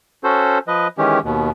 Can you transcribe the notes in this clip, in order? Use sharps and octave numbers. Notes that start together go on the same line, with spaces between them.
C#4 F#4 A4 C5
F3 B4 D#5
D#3 E3 G#3 C#4 G4
D#2 B2